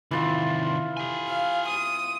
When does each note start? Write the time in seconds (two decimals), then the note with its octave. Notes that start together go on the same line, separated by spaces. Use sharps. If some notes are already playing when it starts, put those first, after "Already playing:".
0.11 C3 D#3 E3 F4
0.97 G4 G#5
1.28 F5
1.68 D#6